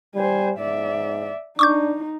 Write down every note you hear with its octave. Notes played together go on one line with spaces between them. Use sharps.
G3 C5 G#5
G#2 D5 E5
D4 D#4 C#6 D6 G6